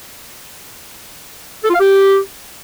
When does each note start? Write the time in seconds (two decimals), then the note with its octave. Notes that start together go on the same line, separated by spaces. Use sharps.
1.64 A4
1.69 F4
1.74 F5
1.80 G4